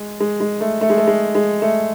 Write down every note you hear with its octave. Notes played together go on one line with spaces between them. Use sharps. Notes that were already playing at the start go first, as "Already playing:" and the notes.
Already playing: G#3
G#3
G#3
A3
A3
G#3
A3
G#3
G#3
A3